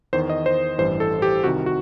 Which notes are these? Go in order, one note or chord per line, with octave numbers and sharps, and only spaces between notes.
E2 D#3 C5
D#5
C5
A1 G2 E3 C5
A4
G4
C2 C3 D#3 F#4
F#4